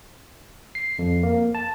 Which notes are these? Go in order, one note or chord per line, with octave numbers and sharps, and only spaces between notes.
C7
F2
A#3
A5